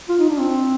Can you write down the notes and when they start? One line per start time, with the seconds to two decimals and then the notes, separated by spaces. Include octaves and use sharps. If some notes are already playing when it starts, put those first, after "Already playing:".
0.09 F4
0.19 D#4
0.29 D4
0.40 C4